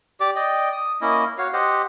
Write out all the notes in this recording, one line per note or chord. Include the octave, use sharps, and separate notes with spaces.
G4 D5 D6
D5 D#5 G5
D#6
A#3 C#4 E4 D#5
F#4 C#5 F5
G4 C5 D#5 F#5